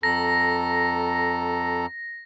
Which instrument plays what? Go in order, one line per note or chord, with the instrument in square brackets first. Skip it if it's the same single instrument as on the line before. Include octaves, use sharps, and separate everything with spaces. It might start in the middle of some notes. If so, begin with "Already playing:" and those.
[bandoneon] F2 A4 A#5 [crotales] A#6